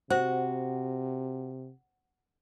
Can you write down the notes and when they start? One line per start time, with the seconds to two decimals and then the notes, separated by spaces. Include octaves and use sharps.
0.10 C3 F#4 C5